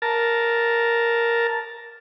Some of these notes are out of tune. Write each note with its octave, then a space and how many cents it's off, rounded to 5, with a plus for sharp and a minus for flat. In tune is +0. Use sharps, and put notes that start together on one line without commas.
A#4 +0 A5 +0